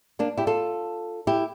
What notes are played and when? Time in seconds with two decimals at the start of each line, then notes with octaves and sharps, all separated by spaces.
0.19 A#3 D4
0.37 E4 G4
0.47 F4 A4
1.27 E4 G4